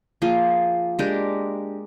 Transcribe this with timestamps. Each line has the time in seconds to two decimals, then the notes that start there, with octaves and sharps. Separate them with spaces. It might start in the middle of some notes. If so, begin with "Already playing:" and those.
0.22 F3 A#3 F4 G#4
0.99 G#3 D4 G4 A#4